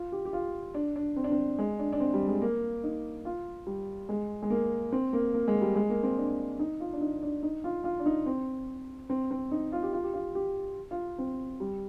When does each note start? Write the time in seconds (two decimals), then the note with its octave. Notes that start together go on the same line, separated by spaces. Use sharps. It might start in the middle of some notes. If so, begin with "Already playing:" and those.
Already playing: F4
0.12 G4
0.25 G4
0.33 F4
0.74 D4
0.96 D4
1.16 C4
1.24 D4
1.32 C4
1.58 G#3
1.79 D4
1.93 D4
2.00 C4
2.14 G3
2.28 G#3
2.42 A#3
2.84 D#4
3.25 F4
3.67 G3
4.09 G#3
4.42 G#3
4.50 A#3
4.92 C4
5.13 A#3
5.34 A#3
5.48 G#3
5.62 G3
5.76 G#3
5.90 A#3
6.03 C4
6.18 D4
6.59 D#4
6.80 F4
6.93 D4
7.01 D#4
7.22 D4
7.43 D#4
7.64 F4
7.84 F4
8.00 D4
8.06 D#4
8.26 C4
9.10 C4
9.31 C4
9.52 D#4
9.72 F4
9.83 G4
9.93 F4
10.03 G4
10.14 F4
10.35 G4
10.91 F4
11.19 C4
11.60 G3